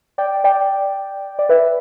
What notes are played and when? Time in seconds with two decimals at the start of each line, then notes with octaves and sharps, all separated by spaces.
0.18 D5 G5
0.44 D5 G5
1.39 D5
1.49 B4 E5